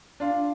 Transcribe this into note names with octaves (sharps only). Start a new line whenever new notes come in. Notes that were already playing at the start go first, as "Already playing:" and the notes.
D4 F4